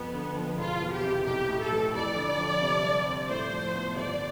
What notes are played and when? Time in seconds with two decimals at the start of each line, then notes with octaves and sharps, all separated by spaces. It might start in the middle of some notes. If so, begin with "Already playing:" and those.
Already playing: F2 B3
0.13 D3
0.36 F3
0.58 E1 F4
0.81 E2
0.92 G4
1.04 C3
1.26 B1 G4
1.48 A2
1.60 A4
1.71 E3
1.93 F2 D5
2.16 D3
2.39 F3
2.61 C3
2.84 G3
3.06 C4
3.29 A2 C5
3.51 F3
3.74 B3
3.96 G1 D5